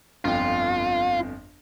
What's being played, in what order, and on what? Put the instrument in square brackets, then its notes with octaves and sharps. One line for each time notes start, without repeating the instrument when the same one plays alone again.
[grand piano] G1 F2 G5 [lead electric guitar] F4